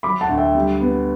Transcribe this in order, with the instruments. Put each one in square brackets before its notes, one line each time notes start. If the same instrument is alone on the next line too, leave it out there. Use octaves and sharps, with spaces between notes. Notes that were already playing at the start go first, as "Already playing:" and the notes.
[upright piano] F#3 [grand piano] B5 D6
[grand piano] F#5 A5
[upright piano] D2
[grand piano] E5 G5
[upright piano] G3
B3